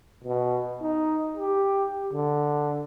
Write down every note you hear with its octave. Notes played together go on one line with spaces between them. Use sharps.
B2
D#4
G4
D3